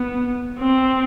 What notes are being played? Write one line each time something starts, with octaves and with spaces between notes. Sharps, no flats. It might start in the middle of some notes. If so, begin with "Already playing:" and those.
Already playing: B3
C4